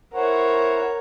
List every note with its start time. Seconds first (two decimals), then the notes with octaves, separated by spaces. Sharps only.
0.14 E4 A#4 C5 C#5 F#5